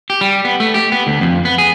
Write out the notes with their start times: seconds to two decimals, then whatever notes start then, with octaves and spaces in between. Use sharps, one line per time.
0.10 G4
0.21 G3
0.45 B3
0.60 A3
0.74 G4
0.92 B3
1.07 D2
1.21 F2
1.45 B3
1.58 G#4